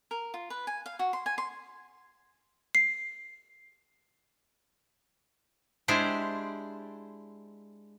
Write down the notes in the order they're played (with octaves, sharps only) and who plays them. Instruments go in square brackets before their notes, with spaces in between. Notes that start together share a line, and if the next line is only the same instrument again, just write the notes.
[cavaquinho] A#4
F4
B4
G#5
F5
F#4
C6
G#5
C6
[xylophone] C7
[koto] G#3 D4 E4 G4 C5